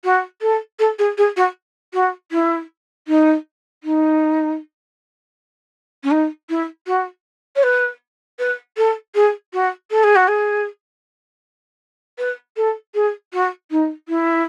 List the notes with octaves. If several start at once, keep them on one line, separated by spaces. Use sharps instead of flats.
F#4
A4
A4
G#4
G#4
F#4
F#4
E4
D#4
D#4
C#4
D#4
E4
F#4
C#5
B4
B4
A4
G#4
F#4
A4
G#4
F#4
G#4
B4
A4
G#4
F#4
D#4
E4